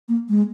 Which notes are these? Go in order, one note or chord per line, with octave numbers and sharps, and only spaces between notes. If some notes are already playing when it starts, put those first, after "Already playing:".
A#3
G#3